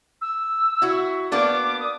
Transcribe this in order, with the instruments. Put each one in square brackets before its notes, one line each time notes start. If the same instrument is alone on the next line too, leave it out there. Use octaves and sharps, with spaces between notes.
[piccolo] E6
[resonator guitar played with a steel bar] E4 F#4
[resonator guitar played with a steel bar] A#3 B3 D4 [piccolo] D6
[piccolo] D#6